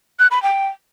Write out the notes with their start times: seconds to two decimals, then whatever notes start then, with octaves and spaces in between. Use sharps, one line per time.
0.19 F#6
0.31 B5
0.43 G5